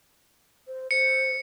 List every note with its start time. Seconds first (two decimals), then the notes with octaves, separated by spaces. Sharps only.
0.67 C5
0.91 C5 C#7